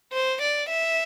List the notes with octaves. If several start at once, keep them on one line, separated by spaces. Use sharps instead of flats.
C5
D5
E5